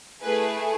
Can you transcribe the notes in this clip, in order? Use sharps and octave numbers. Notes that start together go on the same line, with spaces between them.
A3 E4 G#4 B4